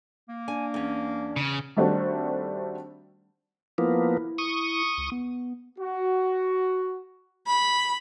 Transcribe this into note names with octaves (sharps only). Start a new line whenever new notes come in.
A#3
D4 G#5
E2 C#4
C#3
D#3 G3 A3 C4 D4 F#4
F3 A#3 B3 E4
C#6 D#6
C#2
B3
F#4
B5